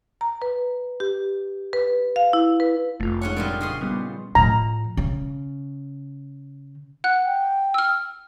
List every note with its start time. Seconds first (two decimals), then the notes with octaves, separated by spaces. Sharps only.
0.21 A#5
0.42 B4
1.00 G4
1.73 B4
2.16 F5
2.33 E4
2.60 B4
3.00 F1 A3 F4
3.22 G#2 C#4 C#5 F#5
3.36 A#2 F3 G3 D4 D#4
3.61 C#3 D#5 C6
3.81 G3 B3
4.35 A2 F3 A#5
4.97 C#3
7.04 F#5 F#6
7.26 G5
7.74 E6 F6